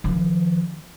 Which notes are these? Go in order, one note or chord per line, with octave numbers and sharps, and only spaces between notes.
D#3 F3